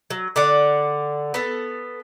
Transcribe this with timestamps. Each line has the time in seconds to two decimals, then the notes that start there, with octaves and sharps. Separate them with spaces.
0.10 F#3
0.36 D3 D5 F#5
1.34 B3 A4